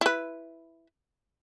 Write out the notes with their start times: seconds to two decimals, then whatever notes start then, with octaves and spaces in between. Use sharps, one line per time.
0.01 E4 B4